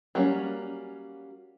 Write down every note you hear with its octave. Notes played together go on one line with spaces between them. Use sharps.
F#3 G3 A#3 B3 C#4